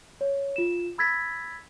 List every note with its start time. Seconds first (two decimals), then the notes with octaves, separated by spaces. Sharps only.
0.21 C#5
0.56 F4 E7
0.98 B5 E6 G#6 A6 B6